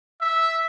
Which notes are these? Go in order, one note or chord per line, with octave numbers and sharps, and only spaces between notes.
E5